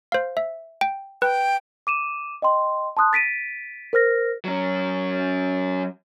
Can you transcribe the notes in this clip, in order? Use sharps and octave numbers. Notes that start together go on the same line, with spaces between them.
C5 F5
E5
G5
B4 G5
D6 D#7 E7
D#5 G5 C6
A5 C6 D#6 F#6
A6 B6 D7 D#7
A#4 C5 F6 A#6
F#3 C#4